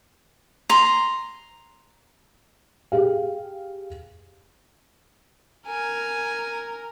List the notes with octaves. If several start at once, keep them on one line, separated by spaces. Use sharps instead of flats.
A#5 C6
G4 G#4 F5
A#4 G#5